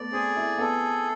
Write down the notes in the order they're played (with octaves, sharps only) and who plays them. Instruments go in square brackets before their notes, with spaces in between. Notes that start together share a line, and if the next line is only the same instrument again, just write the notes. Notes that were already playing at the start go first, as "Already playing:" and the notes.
Already playing: [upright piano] A3 B3 [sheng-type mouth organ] D5
[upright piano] C4 [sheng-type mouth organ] G#4
[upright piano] E4
[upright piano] B3 [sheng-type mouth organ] A4